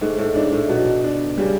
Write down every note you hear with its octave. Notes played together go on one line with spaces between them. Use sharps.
G#2 A3
A2
G#2 D4
A2
B2 F#3
D4
C#3 G3